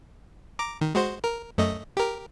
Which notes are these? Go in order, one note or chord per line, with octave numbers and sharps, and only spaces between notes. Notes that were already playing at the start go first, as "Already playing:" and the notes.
A#5 D6
D#3
G#3 F#4 C5
A#4
F#2 A3 D#5
G4 A#4